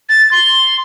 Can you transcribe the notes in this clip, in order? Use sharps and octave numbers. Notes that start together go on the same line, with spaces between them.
A6
C6